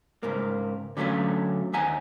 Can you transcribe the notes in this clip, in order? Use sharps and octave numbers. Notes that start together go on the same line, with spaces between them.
C#2 G#2 A#3
D3 F#3 A3 C#4 F4
D#2 D#4 E5 F#5 G#5 A#5